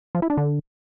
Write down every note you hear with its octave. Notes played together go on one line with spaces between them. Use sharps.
F3
E4
D4
D3